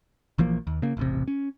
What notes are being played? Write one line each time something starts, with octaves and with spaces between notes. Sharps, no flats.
A#1 E3 F3 A#3
D#2
C#3 A#3
E1 A1 C3
C#4